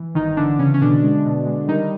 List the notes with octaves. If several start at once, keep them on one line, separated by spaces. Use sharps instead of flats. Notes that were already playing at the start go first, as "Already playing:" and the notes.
Already playing: E3
G1 D#3 D#4
D3 E3 D4
C#3 E3 C#4
C#4
B2 D3 D4
G#3
B2
G#3
D#3 G3 D#4